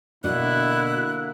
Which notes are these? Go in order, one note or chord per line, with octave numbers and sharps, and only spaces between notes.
B2 D3 A#3 D4 E4 F#6